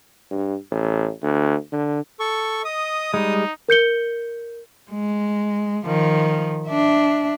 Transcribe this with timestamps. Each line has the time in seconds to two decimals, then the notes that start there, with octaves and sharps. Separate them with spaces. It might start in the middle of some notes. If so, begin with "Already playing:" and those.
0.31 G2
0.71 A1
1.22 D2
1.72 D3
2.20 A4 C#6
2.65 D#5 D#6
3.14 G3 G#3 D#4
3.68 A#4 G6 C#7 G7
4.91 G#3
5.86 D#3 F3
6.68 D4 E5